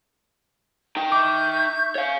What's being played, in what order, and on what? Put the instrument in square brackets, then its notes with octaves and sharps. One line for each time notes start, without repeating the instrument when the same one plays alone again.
[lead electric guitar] D#4 G5
[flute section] E5 C#6 G6 [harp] D6
[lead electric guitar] C#5 F5